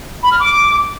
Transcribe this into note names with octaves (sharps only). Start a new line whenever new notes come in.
B5
F6
D6